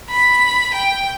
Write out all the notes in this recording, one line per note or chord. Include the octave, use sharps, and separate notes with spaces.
B5
G5